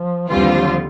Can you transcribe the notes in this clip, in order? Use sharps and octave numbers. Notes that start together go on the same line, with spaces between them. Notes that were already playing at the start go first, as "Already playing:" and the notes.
Already playing: F3
D#2 D3 E3 G3 C4 F4
F3
F#3
F3